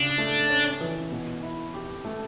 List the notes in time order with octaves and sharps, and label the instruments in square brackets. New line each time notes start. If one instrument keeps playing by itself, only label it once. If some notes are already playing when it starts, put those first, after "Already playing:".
Already playing: [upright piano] C#3 [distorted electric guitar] D4
[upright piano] A3
C#4
E3
B2
E4
G4
A3